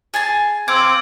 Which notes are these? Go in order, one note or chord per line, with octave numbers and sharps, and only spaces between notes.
G#4 G#5 A5
C4 F5 D6 E6 G#6